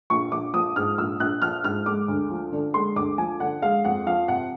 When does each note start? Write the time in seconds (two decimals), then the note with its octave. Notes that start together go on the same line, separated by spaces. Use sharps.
0.10 A#1 C#6
0.32 A#1 D6
0.54 F3 D#6
0.76 G#2 F6
0.98 A#1 E6
1.20 A#1 F#6
1.42 F3 F6
1.64 G#2 F6
1.86 G#3 D6
2.08 D2
2.30 F3
2.52 D3
2.74 G#3 C6
2.96 D2 D6
3.18 F3 G#5
3.40 D3 F#5
3.62 G#3 F5
3.85 F2 F#5
4.07 F3 F5
4.28 C3 F#5